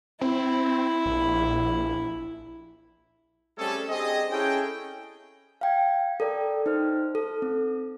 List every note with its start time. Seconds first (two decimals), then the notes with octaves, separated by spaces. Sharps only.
0.21 C4 E4
1.06 A#1
3.58 G3 A3 C4 C#4 G#4 A4
3.89 C4 D4 G4 G#4 D#5
4.31 C#4 E4 G#4 A4 G5
5.61 F5 G5 G#6
6.20 A4 A#4 D5 G5
6.66 D#4 C5 F6
7.15 A4
7.42 C4